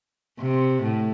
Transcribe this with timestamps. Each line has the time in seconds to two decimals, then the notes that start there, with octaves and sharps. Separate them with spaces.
0.40 C3
0.83 A2